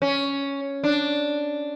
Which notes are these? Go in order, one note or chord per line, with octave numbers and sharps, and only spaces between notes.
C#4
D4